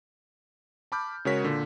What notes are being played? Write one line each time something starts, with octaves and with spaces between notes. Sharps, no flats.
A5 B5 D6 F6 G6
C#3 G#3 F#4 A#4 C#5 B6
A#2 D3